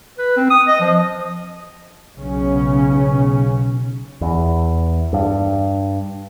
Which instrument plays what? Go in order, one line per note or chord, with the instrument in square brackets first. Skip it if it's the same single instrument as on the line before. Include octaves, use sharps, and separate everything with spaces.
[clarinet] B4
C4
D#6
D#5
F3
[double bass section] B1 C#3 C#4
[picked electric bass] E2
G2